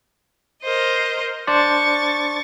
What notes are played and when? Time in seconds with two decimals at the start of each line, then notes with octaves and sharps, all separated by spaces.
0.62 A#4 C5 D#5
1.47 D4 C5 D5 C#6 A6